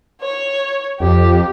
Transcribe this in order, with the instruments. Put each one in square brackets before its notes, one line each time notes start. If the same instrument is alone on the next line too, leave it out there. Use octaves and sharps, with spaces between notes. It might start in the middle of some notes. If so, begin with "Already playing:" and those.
[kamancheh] C#5
[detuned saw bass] F2 [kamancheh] G4